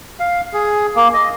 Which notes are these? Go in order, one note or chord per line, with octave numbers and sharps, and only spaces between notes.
F5
G#4
A#3
D#5